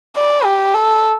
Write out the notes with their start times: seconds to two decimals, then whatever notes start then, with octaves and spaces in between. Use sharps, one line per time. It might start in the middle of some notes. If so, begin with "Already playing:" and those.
0.16 D5
0.45 G4
0.74 A4